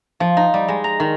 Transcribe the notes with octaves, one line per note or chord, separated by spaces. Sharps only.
F3
D#4
G3
G#3
A#5
D#3